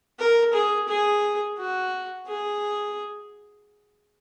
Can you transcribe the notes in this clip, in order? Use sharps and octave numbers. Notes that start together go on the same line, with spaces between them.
A#4
G#4
G#4
F#4
G#4